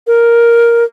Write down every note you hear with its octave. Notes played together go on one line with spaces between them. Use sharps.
A#4